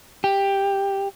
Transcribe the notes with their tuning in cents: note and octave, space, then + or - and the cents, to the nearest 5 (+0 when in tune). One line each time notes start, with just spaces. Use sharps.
G4 +10